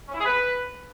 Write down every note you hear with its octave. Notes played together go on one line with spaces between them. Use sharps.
C#4
E4
G#4
B4